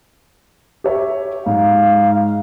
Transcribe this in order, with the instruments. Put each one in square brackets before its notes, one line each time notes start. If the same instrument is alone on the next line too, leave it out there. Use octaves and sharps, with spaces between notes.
[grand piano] G4 C#5 E5
[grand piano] G#2 [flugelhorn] F5